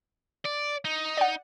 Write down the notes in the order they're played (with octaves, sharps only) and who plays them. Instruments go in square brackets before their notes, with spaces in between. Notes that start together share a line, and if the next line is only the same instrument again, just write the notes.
[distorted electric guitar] D5
D#4
[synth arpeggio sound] D5 F#5